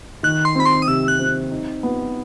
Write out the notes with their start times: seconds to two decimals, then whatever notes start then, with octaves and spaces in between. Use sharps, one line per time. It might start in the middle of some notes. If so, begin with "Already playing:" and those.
0.23 D#3 F#6
0.45 C6
0.55 C4 B5
0.66 C6
0.82 D#6
0.87 C3 E6
1.08 F#6
1.19 C4
1.51 D#4
1.83 B3